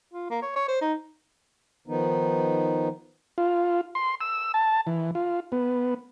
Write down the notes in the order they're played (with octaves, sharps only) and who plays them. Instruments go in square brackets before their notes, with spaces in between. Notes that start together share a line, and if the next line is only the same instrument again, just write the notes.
[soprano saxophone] F4
A#3
C#5
C#5
C5
D#4
[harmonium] D#3 F3 B3 D#4
[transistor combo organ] F4
C6
E6
A5
E3
F4
B3